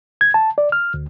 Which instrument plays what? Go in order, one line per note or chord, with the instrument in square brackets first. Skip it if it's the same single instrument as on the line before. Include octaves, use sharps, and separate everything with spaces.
[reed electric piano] G#6
A5
D5
F6
D2